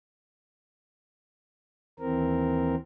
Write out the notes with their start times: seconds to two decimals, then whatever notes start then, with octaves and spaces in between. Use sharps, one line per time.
2.00 D#2 E3 C4 A#4